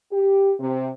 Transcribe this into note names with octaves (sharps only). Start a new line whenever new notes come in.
G4
C3